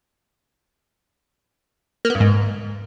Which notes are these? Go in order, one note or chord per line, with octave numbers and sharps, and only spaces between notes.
A#3
B3
G2
G#2